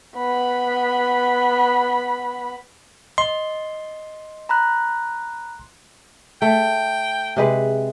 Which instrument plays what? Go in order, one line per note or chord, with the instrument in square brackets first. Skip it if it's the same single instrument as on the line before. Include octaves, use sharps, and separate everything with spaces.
[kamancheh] B3 B5
[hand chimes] D#5 [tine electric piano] C6
[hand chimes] A#5 B5 F#6
[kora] A3 [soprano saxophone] G5
[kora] C3 G#3 B4